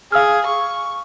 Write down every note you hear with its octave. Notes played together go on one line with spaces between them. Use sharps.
G#4 F5 E6 F6
C#6